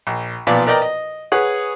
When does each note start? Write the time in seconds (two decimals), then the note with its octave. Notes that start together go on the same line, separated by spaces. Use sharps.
0.07 A#1
0.47 B1 A#2 F3 B3 F4 D5
0.67 A#4 B4 D5 D#5 G5 A#5
0.82 D#5
1.32 G#4 B4 C#5 F#5